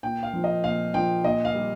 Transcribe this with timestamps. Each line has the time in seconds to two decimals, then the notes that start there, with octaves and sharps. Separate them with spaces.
0.03 A#2 G5
0.23 F5
0.33 F3
0.44 D#5
0.63 A#2 F5
0.94 F3 G5
1.24 A#2 D#5
1.45 F5
1.55 G3